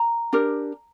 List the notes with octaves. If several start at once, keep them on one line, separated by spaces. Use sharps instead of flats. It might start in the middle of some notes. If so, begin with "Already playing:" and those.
Already playing: A#5
D4 G4 A#4